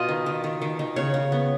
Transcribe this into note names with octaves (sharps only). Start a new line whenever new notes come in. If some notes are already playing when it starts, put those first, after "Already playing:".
Already playing: B2 F4 D#5
D#3
D#3
D#3
D#3
D#3
C#3 C#5
C#3
B3